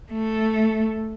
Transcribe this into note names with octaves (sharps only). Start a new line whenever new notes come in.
A3